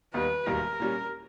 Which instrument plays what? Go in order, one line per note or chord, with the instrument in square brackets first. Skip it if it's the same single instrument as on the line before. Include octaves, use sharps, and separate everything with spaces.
[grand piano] D#2 D#3 G3 B3 D#4 [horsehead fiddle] B4
[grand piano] E1 D#2 D#3 G3 [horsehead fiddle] A#4
[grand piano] A#2 G3 C#4